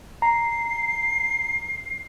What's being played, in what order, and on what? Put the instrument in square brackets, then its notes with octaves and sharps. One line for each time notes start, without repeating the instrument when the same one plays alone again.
[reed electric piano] A#5 [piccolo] C7